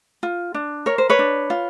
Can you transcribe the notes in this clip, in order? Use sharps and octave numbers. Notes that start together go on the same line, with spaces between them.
F4
D4
A#4 C#5
C5
B4 C#5
D4
F4